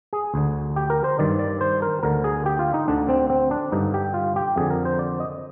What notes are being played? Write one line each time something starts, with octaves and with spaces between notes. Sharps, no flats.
G#4
D2 D3
G4
A#4
C5
G2 D#3 D5
D5
C5
A#4
D2 D3 A#4
G#4
G4
F4
D#4
D2 D3 D4
C4
C4
D4
G2 D3 D#4
G4
F4
G4
F2 D3 G#4
A#4
C5
D5
D#5